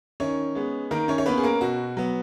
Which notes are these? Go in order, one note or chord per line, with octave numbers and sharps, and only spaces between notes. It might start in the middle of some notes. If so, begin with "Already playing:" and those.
D#3 C#4 C#5
G#3 B3
D#3 A#3 A#4
C#4 C#5
C#5
A#3 B3 C#4 B4
G#4
A#3 A#4
B2 F#4
F#3 B3